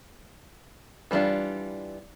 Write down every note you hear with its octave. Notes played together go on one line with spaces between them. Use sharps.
E3 G3 B3 D4 F4